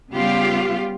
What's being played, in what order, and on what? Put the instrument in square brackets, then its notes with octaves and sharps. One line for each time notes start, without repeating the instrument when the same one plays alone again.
[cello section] C#3 G3 B3 F4 G4 F5